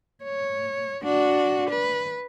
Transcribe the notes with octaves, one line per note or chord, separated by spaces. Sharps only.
C#5
D4 F#4
B4